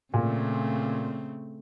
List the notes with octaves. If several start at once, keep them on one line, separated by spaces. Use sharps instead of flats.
A#2 C#3 A3 C4